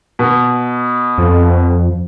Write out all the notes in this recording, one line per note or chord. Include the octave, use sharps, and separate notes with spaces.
B2
F2